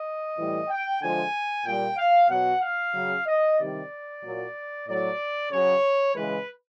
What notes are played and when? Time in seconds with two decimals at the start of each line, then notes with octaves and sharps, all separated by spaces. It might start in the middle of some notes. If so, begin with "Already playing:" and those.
Already playing: D#5
0.37 A2 E3 G3
0.68 G5
1.01 D3 F3 G#3 G#5
1.65 A#2 G3 G5
1.97 F5
2.29 B2 F#3 F#5
2.61 F5
2.93 C#3 F#3
3.26 D#5
3.58 C3 D#3 G3 D5
4.22 A#2 F#3
4.86 A2 F#3 D5
5.51 C#3 F#3 C#5
6.15 C#3 E3 G#3 B4